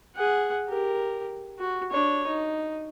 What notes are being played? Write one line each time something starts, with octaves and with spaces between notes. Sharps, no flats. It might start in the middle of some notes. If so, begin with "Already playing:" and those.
G#4 F#5
G4 A#4
F#4
D4 C#5
D#4